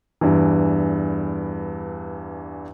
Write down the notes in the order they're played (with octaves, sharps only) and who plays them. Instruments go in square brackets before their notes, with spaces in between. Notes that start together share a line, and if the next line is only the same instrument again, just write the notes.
[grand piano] E2 G2 E3